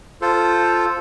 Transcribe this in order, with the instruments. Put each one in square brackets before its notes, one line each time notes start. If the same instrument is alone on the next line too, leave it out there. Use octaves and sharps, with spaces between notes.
[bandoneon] F4 A4 C5